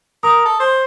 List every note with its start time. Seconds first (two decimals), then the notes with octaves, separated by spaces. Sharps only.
0.23 A#4 D#6
0.45 A4
0.60 C5